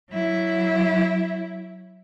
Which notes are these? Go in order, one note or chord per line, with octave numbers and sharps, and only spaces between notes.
F#3 E4